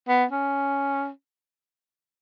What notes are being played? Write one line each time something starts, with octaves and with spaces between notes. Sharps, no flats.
B3
C#4